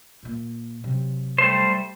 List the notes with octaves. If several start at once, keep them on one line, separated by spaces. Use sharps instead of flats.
A#2 A#3
C3 F#3
G3 A3 C5